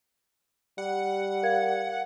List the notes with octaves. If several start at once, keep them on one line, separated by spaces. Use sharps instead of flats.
G3 F#5
A#4 F5 G#6